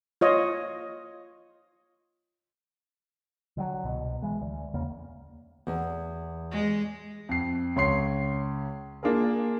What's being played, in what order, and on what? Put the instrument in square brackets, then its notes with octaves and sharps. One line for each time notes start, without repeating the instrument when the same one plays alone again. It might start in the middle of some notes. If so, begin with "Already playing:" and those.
[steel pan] F4 C#5 D#5
[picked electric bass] D3 E3 F#3
C2 B2
E3 G#3
D2
E2 C#3 A#3
[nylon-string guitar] E2 G#5
[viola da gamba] G#3
[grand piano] F2 C7
C#2 C#5 C6 C7
A#3 D4 F4 G#4 A#4